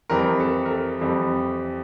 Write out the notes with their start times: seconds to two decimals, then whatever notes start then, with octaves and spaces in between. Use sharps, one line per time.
0.10 F2 E3 G3 C4 A#4
0.40 A4
0.65 A#4
0.71 A4
1.01 F2 E3 G3 C4